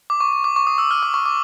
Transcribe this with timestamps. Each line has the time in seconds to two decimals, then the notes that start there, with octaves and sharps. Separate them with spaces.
0.10 D6
0.21 C#6
0.33 D6
0.44 D6
0.56 C#6
0.67 D#6
0.78 E6
0.91 F6
1.03 D6
1.14 C#6
1.26 D6